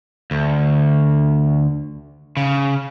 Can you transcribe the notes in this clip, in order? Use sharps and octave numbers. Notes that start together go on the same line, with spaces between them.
D2
C#3